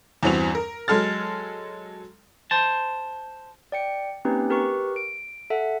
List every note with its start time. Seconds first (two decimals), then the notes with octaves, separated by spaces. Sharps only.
0.23 E2 G2 E3 C4 F#4 F7
0.55 A#4
0.88 F#3 G#3 A4 F6 A6
2.51 C5 A5
3.72 D5 G5 C#7
4.25 A#3 C4 C#4 D#4 G4 B4
4.50 G4 A#4 B4 C#6
4.96 D7
5.50 A4 E5 F#5